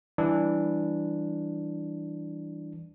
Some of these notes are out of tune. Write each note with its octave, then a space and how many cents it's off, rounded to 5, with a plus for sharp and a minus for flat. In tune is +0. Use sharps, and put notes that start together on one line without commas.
E3 +0 G3 +0 D4 +0